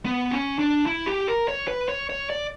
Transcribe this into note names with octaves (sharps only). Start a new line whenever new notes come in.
B3
C#4
D4
E4
G4
A#4
C#5
B4
C#5
C#5
D5